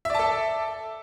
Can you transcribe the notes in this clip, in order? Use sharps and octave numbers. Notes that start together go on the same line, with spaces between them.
A4 D5 E5 A5